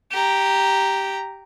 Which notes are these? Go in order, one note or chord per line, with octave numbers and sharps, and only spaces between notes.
G4 A#5